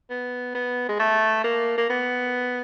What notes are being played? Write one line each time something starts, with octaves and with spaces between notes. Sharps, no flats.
B3
B3
G#3
A3
A#3
A#3
B3